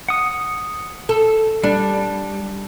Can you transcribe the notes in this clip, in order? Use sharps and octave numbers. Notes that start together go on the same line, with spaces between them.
F#5 D#6
A4
G3 D4